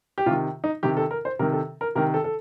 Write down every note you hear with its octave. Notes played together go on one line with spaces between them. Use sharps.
G4
C3 D#3 F4
D#4
C3 D#3 G4
A4
A#4
C5
C3 D#3 A#4
A4
A#4
C3 D#3 A#4
A4
A4